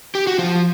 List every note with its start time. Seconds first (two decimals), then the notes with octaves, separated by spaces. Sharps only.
0.15 G4
0.27 F#4
0.38 F3 F4